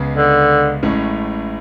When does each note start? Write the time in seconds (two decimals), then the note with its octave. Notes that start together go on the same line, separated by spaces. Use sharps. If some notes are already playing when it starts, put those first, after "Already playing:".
Already playing: C#2 C#3 G#3 B3
0.15 D3
0.83 A1 A2 G#3 C#4